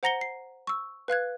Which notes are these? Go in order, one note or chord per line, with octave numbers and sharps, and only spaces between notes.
C5 F#5 A#5 A#6 C#7 G7
C7
C#6 E6
B4 F5 F#6 G#6